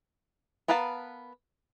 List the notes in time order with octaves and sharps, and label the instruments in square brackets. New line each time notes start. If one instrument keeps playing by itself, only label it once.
[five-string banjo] B3 A#4 B4 F5 A5